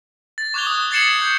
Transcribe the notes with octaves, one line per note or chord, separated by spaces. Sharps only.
A6
C#6 D6 F#6 G#6 F7 G7
D#6 F#6
G#6 A6 C7 C#7 E7 F#7
G6